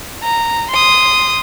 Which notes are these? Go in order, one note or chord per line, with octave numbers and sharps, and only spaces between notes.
A#5
C6 D#6